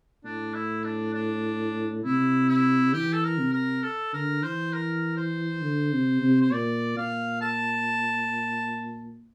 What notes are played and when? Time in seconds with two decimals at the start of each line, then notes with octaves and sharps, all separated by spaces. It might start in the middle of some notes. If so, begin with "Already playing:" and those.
0.24 A2 D4
0.54 E4
0.84 D4
1.14 D4
2.04 C3 E4
2.49 E4
2.93 E3 G4
3.13 A4
3.24 A#4
3.38 C3
3.53 A#4
3.83 A4
4.13 D3 A#4
4.42 E3 C5
4.73 A#4
5.17 C5
5.63 D3
5.93 C3
6.22 C3
6.41 C5
6.52 A#2 D5
6.97 A#2 F5
7.41 A5